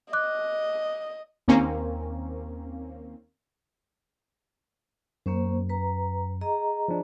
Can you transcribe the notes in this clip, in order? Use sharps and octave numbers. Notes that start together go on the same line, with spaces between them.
D#5 D6 F#6
D#2 A#3 C4 C#4
F#2 A#3 C#4 C5
B4 A#5
G#4 D#5 A#5
F3 D4